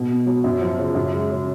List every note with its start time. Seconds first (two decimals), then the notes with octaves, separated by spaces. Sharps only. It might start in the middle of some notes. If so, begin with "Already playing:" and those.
Already playing: B2
0.10 B3
0.26 F#3
0.44 F#2
0.61 F3
0.79 C#3
0.95 F#2
1.13 G#3
1.31 C#3